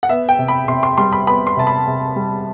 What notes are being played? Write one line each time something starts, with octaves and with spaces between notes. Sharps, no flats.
F#5
B3 E5
G5
C3
B5
C3 C6
C6
G3 C6
B5
B3 B5
C6
C3 A5
B5
C3
G3